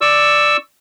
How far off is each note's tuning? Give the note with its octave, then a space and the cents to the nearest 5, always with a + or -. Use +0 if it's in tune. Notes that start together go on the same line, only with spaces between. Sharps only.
D5 +5 C#6 +0 E6 +0